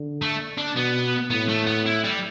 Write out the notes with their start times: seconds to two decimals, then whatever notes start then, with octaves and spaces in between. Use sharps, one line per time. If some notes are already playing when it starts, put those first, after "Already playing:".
Already playing: D3
0.22 A3
0.58 D4
0.76 B2 B3
1.31 A2 B3
1.49 A3
1.67 B3
1.86 E4
2.04 G3